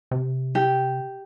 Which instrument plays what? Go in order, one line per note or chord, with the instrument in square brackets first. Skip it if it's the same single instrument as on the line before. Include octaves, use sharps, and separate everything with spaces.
[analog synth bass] C3
[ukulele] G4